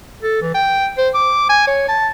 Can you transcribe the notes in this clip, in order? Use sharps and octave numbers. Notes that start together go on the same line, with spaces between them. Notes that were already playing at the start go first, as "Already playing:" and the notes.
A4
E3
G5
C5
D6
G#5
C#5
A5